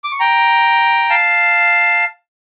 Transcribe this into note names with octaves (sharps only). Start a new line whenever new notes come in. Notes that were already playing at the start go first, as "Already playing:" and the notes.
D6
C#6
G5 A#5
F5 A5